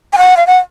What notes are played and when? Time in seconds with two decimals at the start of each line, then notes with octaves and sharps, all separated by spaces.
0.13 G#5
0.18 F#5
0.37 F5
0.47 F#5